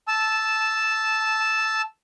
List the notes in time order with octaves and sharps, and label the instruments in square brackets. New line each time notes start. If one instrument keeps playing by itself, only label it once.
[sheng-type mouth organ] A5 E6